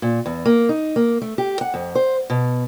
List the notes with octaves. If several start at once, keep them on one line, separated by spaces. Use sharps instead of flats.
A#2
E2
A#3
D#4
A#3
A3
G4
F#5
F2
C5
B2